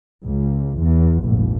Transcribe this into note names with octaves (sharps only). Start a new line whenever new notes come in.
C#2
E2
F1 A#1 G#2